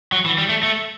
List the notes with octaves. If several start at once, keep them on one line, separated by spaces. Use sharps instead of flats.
F#3
E3
G3
A3
A3